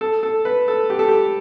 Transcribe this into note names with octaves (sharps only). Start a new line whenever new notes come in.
A4
A4
B4
A4
G4
A4
G4